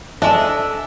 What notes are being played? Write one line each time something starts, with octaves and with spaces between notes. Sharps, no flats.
G#3 D4 A4 D#5 E5 A5